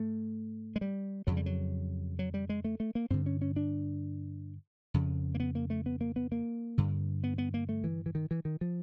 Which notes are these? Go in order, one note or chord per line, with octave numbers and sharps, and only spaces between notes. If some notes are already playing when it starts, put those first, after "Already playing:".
Already playing: G#2 A3
G#3
G3
F2 C#3 F#3
G3
F#3
F#3
G3
G#3
A3
A3
A#3
G2 D3 C4
C#4
C#4
D4
F2 C#3
A#3
B3
A#3
A3
B3
A#3
B3
A#3
G2 D3
B3
B3
A#3
A3
E3
E3
D#3
E3
D#3
F3